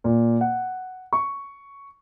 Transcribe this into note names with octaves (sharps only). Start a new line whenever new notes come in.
A#2
F#5
C#6